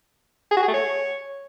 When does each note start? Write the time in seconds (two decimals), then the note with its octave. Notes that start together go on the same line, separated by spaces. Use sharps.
0.51 G#4
0.57 F#4
0.63 G#4
0.68 A3
0.74 C#5